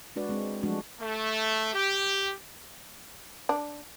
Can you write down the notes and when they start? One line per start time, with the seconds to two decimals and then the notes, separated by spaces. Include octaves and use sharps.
0.16 G#3 D4 F#4 B4 D5
0.29 G#3 C4
0.63 F3 F#3 G#3 A3 D4 F#4
1.00 A3
1.73 G4
3.49 D4